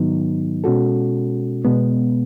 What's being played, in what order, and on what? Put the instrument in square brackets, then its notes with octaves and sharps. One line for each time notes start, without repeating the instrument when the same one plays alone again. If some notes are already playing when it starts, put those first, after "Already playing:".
Already playing: [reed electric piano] G#2 D#3 F#3 B3 D#4
B2 G#3 C#4 F#4 A4
B2 G#3 B3